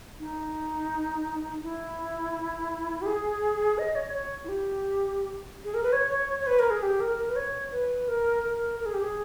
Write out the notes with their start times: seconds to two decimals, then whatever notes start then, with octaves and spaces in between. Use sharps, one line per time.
0.20 D#4
1.63 E4
3.02 G4
3.06 G#4
3.78 D#5
3.95 C#5
4.14 C#5
4.44 E4
4.49 G4
5.65 G#4
5.74 A#4
5.83 B4
5.93 C#5
6.11 C#5
6.28 C#5
6.40 C#5
6.47 B4
6.59 A#4
6.70 G#4
6.83 G4
7.00 A#4
7.18 A#4
7.29 B4
7.36 C#5
7.72 B4
8.08 A#4
8.44 A#4
8.80 A#4
8.86 G#4
8.94 G4
9.01 G#4